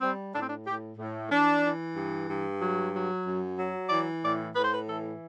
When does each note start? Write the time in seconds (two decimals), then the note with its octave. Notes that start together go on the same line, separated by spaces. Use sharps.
0.01 G3 C4
0.34 A2 D4
0.41 C4
0.49 D4
0.65 A2 G4
0.98 A2
1.30 E3 D4
1.63 E3
1.95 G2
2.28 G2
2.60 F#3
2.93 F#3
3.25 F#2
3.58 F#3
3.90 E3 D5
4.23 A2 D5
4.55 A2 B4
4.64 C5
4.72 B4
4.88 E3 A4